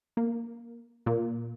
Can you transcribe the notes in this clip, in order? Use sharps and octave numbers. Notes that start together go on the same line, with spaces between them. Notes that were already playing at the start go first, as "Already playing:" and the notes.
A#3
A#2